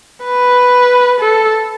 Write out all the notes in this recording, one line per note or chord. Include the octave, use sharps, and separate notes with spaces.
B4
A4